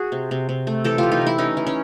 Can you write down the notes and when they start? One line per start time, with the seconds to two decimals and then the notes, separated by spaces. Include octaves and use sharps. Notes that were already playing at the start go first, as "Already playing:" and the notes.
Already playing: F#4 G#4
0.12 C3
0.31 C3
0.49 C3
0.67 A3
0.84 E3 G4 A4
0.98 E3 F4 G4
1.12 D#4 F4
1.21 E3
1.27 E4
1.38 E3 C#4 D#4
1.57 E3
1.67 C#4